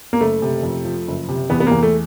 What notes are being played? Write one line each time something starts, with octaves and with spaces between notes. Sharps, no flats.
A#3
F#1 A3
C3
F2
F3
F#1
C3
E2 B3
B3
A#3
E2
A3